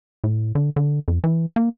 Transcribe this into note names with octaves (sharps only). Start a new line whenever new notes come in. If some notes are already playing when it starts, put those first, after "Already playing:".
A2
D3
D3
F2
E3
A#3